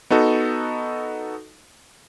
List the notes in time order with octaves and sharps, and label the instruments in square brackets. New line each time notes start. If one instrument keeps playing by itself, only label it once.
[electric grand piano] B3 D#4 F#4 A4